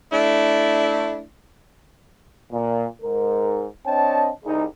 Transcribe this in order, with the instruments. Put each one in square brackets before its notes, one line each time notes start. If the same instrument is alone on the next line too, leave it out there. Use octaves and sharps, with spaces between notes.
[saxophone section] A3 D4 E4
[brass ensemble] A#2
G#2 A#4
C4 D4 C#5 D#5 G5 A5
C2 D#4 G#4